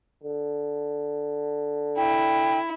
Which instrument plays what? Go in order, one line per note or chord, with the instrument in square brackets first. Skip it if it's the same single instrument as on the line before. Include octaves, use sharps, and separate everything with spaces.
[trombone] D3
[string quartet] E4 [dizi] G5